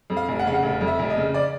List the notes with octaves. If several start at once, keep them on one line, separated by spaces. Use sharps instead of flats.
F2
F5
F1
F#5
C#3 F5
F#5
F1
F2
E5
F1
D#5
C#3
D5